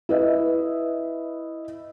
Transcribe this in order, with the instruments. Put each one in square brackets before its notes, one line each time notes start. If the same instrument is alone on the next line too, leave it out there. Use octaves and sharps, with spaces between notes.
[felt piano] E4 B4 D#5 E5